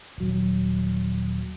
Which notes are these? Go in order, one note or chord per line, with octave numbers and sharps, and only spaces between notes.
D#1 F#3